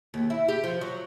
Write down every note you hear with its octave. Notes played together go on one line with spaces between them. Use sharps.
D#2
E4
G4
F3
F#3